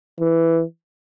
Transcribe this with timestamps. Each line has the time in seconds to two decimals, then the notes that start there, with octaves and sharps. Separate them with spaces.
0.20 E3